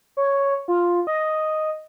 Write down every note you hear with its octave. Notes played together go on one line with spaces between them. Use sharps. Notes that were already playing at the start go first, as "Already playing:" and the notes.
C#5
F4
D#5